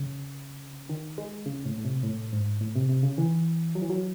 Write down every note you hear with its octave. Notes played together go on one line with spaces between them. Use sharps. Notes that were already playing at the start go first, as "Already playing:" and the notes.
Already playing: C#3
D#3
G#3
C#3
A2
A2
C3
A2
G#2
A2
C3
C3
C#3
E3
F#3
E3
F#3